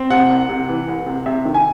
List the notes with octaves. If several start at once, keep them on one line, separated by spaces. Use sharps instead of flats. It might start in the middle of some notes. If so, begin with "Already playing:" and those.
Already playing: C4
C3 F#5
C2
C3
E3
C2
C3
C3 E5
D#3
G#5